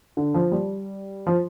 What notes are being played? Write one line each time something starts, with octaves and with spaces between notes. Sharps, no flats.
D3
F3
G3
F3